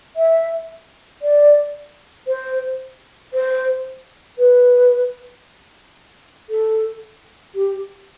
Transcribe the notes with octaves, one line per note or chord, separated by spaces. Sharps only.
E5
D5
C5
C5
B4
A4
G4